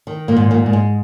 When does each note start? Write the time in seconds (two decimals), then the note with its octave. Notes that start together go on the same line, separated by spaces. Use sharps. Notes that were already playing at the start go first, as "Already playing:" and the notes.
0.07 D#3
0.28 A#2 A#3
0.37 G#2
0.51 A#2 A#3
0.66 G#2
0.73 G#3